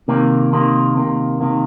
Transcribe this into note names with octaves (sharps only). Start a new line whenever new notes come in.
C3 D#3 A#3
C3 D#3 A#3
C3 D#3 A#3
C3 D#3 A#3